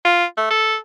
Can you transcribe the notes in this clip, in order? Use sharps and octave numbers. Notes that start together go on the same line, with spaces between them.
F4
A3
A4